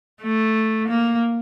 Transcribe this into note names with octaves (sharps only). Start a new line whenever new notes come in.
A3
A#3